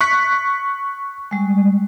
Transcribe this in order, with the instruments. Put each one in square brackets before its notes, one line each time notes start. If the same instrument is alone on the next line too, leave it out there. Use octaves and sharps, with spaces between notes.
[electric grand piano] C#6 F#6 B6
[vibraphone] G3 G#3